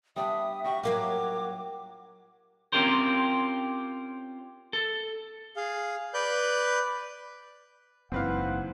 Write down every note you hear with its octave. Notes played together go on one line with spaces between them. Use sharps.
G3 B3 D4 E5 D#6
G3 F#4 C#6
F#3 A#3 F4 F#5 D6
C4 C#4 F4 G4 A#4 C5
A4
G#4 F5
B4 D5 F#6 G6
F#1 G#2 E3 C4 B4 F5 F#5